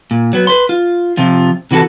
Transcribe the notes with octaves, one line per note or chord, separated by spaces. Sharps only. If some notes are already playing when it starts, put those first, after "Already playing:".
A#2
F#3 B3
B4 C6
F4
C3 F3 F4
C3 E3 F#4 G4 A4